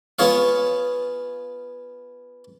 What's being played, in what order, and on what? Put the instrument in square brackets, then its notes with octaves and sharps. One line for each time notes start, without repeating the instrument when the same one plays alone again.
[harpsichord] B3 F4 G#4 C#5 F5